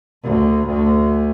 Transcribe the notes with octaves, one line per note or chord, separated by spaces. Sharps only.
D2
D2